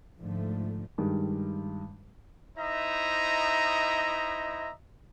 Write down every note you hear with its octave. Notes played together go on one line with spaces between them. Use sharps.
G#2 D3 F3 A3
G2 D#3 G3 G#3
D#4 E4 C5 D#5 E5 A#5